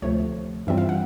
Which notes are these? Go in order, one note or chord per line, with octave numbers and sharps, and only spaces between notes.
D2 C3 F3 A3 C#5
G2 E3 G3 C4 F4 E5
F5
F#5